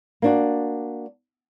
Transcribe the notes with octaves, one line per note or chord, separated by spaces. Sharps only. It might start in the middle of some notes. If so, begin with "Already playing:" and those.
A#3 D4 F#4